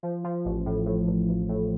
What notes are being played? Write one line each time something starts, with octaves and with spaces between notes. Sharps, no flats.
F3
F3
A1
A2
A2
A1
A1
A2